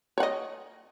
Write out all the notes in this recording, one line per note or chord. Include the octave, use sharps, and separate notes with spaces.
C#5 D#5 F#5